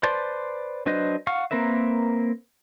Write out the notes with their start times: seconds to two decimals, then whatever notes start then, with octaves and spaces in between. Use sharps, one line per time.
0.03 B4 C5 D5 A5 C6
0.86 F#3 D4 B4 C5 D#5
1.27 F5 F#5 C#6 F6
1.51 A#3 C4 A#4 B4 E5